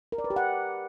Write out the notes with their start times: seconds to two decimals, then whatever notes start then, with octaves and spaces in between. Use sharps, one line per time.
0.12 A#4
0.18 D5
0.24 B4
0.30 G4
0.36 F#5